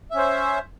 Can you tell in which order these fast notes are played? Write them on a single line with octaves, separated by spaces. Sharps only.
E5 C#4 C5